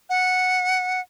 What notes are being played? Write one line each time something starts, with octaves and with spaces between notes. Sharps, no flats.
F#5